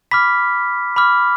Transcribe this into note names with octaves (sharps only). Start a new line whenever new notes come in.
B5 D6 F6 B6
B5 D6 F6